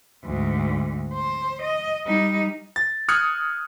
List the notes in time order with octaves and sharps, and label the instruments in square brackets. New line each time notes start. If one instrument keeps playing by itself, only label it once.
[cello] D2 G#2
C5
D#5
G3 D#4
[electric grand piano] A6
D#6 F6 F#6 G#6 C#7